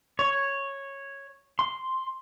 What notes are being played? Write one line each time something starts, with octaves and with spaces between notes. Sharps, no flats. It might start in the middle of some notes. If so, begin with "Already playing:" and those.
C#5
C6